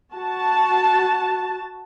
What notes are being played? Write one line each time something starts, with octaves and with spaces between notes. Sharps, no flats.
F#4 A5